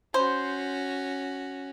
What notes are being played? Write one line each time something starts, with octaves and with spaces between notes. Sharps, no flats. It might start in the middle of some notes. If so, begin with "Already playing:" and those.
C#4 F#4 C5